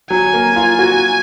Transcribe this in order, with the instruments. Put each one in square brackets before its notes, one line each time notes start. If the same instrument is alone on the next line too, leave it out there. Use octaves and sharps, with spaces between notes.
[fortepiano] F#3 [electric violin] G#5
[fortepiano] A#3
F4
F#4